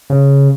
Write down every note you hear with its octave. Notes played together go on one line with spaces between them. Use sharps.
C#3